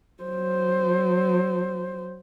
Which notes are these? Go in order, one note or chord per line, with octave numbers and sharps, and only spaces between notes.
F#3 C5